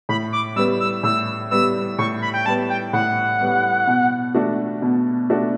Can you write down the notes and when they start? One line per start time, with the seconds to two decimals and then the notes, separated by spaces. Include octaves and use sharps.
0.09 A2 B5
0.33 D6
0.56 G3 B3 E6
0.80 E6
1.03 A2 E6
1.51 G3 B3 E6
1.98 A2 C#6
2.22 B5
2.34 G5
2.45 G3 A5
2.49 B3
2.70 G5
2.93 A2 F#5
3.41 G3 B3
3.87 B2
4.35 A3 D4 F#4
4.82 B2
5.30 A3 D4 F#4